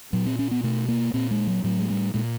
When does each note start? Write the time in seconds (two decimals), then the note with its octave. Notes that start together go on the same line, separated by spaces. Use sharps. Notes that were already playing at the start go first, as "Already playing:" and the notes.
0.13 A#2 F#3
0.26 C4
0.39 C#4
0.51 B3
0.63 B2 A3
0.88 A#3
1.14 A#2 C4
1.31 G#3
1.47 F#3
1.64 A2 F#3
1.79 G#3
1.90 G3
2.14 A#2 G#3